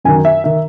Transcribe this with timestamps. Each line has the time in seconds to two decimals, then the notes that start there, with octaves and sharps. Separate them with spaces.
0.04 F#2 D#3 G#5
0.25 E5
0.44 D#3 E5